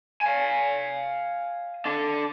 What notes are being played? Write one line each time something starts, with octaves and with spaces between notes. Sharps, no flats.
F5 G#5
D4 A4